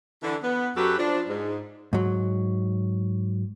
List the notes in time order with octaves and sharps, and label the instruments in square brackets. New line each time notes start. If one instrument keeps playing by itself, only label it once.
[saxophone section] D3 E3
B3
F#2 F#3 F#4 G4 A4 B4
F3 D4
G#2
[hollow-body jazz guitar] G#2 F#3